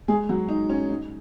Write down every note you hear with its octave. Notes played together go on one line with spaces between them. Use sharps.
G#3 G#4
F#3 F#4
D#4
C#4
D#4